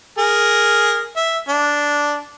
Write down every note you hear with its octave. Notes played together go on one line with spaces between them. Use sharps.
G#4 A#4
E5
D4